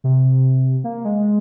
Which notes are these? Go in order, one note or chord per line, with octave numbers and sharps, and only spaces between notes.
C3
A#3
G#3